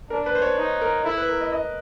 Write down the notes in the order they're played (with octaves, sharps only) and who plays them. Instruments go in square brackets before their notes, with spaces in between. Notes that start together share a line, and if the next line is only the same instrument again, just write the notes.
[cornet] D4 [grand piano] A#4
[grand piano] B4
C5
C#5
[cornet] D#4
[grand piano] A#4
[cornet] E4 [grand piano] A4
[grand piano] B4
A#4
D#5
D#5